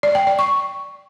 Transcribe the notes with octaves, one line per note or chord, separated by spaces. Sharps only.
D5
G5
D5
C#6